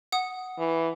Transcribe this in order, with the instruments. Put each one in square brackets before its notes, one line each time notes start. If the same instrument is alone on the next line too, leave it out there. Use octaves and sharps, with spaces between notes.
[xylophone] F#5 D#6
[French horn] E3